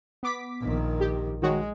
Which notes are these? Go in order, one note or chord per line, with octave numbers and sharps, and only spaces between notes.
B3 D6 B6
A#1 D#3
G4
D#3 G#3 F#4 C#5